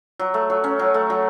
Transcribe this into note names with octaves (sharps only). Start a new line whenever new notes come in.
F#3
A3
F#3
C#4
F#3
A3
F#3